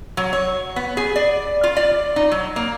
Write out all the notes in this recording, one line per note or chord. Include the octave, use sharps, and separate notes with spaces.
F#3
C#5
B3
G#4
D5
F4
D5
D#4
F#3
A#3